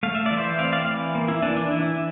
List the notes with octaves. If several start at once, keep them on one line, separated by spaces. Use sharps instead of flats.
A3 F5
E5
E3 D5
C5 E5
C4 D5 F5
D5 F5
E3
A#3
E4
E3 D4
D4
E3 E4